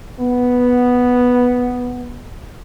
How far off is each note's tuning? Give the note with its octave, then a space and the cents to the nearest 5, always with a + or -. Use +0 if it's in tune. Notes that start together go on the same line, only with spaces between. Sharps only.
B3 +0